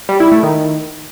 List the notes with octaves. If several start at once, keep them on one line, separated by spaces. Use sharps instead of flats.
G3
E4
A3
D#3